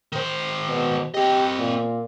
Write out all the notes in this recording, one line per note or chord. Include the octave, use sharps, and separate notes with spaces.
D#3 C5
B2
C4 G4 D#5
A#2